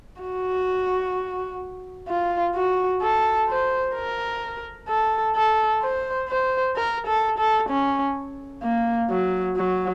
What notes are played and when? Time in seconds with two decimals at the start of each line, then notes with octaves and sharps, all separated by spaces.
0.22 F#4
2.09 F4
2.55 F#4
3.02 A4
3.49 C5
3.95 A#4
4.89 A4
5.36 A4
5.82 C5
6.29 C5
6.76 A#4
7.07 A4
7.38 A4
7.70 C#4
8.63 A#3
9.10 F#3
9.56 F#3